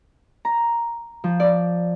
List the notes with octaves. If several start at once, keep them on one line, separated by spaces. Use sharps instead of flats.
A#5
F3
D5